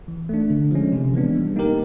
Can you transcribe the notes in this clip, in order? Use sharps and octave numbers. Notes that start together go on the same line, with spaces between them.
E3
A3 D4
D3
F3 G#3 C#4
C3
E3 G#3 B3 D4
G3
A#3 D#4 G4 A#4